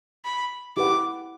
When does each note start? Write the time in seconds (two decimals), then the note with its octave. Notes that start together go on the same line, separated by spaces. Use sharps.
0.25 B5
0.77 E4 G4 B4 F#5 D6